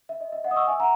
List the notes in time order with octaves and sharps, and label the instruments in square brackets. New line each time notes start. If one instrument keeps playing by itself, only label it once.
[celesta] E5
D#5
E5
D#5 F#5
D#6
C#6 E6
E5 G#5
F#5 A#5